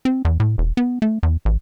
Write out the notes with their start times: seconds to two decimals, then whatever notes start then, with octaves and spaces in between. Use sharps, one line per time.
0.05 C4
0.25 E2
0.40 A2
0.58 E1
0.77 B3
1.02 A3
1.23 E2
1.45 A1